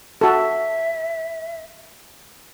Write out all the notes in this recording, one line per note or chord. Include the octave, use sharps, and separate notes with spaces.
F#4 A4 E5